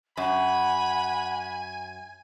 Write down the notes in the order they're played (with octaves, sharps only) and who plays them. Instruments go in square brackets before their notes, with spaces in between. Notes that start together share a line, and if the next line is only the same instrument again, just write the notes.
[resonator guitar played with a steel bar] F#2 [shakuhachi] F#5 [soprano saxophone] G#5 [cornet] B5